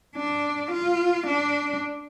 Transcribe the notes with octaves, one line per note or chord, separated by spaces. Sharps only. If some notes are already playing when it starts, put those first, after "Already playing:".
D4
F4
D4